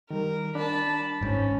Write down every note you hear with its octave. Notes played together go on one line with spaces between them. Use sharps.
D#3 G3 A#4
D4 A5 B5
G#1 G#2 C#4